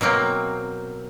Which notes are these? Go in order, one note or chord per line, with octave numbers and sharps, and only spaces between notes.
B2 F#3 A#3 C4